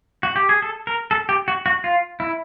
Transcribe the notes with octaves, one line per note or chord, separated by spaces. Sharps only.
F#4
G4
G#4
A4
A#4
A4
G4
F#4
F#4
F4
E4